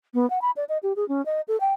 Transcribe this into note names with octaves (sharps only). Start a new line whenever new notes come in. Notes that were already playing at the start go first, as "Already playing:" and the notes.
B3
F#5
B5
D5
D#5
G4
G#4
C#4
D#5
A4
G5